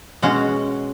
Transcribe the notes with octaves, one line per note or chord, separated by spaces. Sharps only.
B2 G#3 C#4 F#4